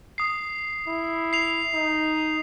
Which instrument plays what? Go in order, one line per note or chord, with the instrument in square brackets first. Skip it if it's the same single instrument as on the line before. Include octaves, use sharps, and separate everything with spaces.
[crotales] D#6 C7
[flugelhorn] E4
[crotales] C7 F7
[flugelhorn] D#4